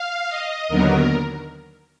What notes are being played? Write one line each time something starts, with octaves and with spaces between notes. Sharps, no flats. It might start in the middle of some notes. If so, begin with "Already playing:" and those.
Already playing: F5
D#5
D#2 D3 F#3 B3 A#4